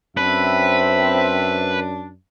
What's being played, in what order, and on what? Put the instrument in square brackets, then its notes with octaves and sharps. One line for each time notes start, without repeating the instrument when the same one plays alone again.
[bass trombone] F#2 [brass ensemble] C4 E5 [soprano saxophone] D4 [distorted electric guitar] B4